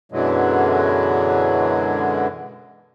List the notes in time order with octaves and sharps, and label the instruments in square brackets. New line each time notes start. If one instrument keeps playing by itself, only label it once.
[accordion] F#2 B2 D3 E3 F#3 G#3